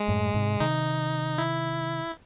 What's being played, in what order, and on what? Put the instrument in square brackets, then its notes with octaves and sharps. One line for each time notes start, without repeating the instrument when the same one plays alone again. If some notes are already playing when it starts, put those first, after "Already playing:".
Already playing: [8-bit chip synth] G#3
[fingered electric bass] F#2 A2
G#2 C3
[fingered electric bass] C3 D#3 [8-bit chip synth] D#4
[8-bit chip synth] E4